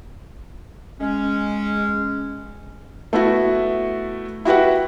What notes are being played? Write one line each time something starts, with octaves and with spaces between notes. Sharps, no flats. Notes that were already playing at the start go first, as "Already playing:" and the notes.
G#3 C#4
A3 B3 E4 F#4
E4 F#4 G4 B4 F#5